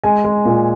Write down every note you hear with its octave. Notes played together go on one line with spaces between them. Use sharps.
G#3 G#5
G#3
A#2